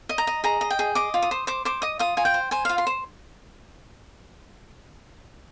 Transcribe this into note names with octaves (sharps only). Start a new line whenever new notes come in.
D#5
A#5
D#5
G#4 A#5
D#5
G5
G#4
D#5 D6
F4
D#6
C5
C5 D6
C5 D6
D#5 D#6
F4 D#6
F4 G#5
G5
C5
C5 G#5
F4 F5
C6
C5